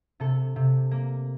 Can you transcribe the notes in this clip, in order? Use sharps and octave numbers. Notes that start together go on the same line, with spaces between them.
C3 A4
C3
A#3